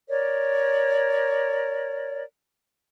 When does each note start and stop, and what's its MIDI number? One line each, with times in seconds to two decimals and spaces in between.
0.08 2.23 70
0.08 2.23 73
0.08 2.23 74